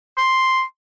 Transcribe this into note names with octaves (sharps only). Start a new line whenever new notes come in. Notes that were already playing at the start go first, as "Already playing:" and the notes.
C6